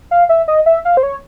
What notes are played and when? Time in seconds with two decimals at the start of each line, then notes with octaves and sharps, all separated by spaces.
0.11 F5
0.29 E5
0.48 D#5
0.66 E5
0.85 F5
0.97 C5
1.03 C#5